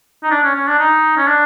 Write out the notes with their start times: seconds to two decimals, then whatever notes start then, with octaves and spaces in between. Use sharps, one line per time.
0.23 D#4
0.31 D4
0.44 C#4
0.55 C#4
0.67 D4
0.80 D#4
1.17 C#4
1.27 D4